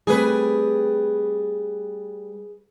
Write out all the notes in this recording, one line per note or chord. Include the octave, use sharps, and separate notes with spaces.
G3 A3 C4 G#4 B4